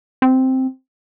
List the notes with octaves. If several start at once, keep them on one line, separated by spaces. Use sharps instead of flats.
C4